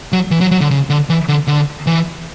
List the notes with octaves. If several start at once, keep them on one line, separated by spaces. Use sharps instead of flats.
F#3
E3
F#3
F#3
D3
C#3
D3
E3
D3
D3
E3